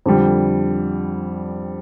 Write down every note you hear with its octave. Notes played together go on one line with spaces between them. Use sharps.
F2 D3 G3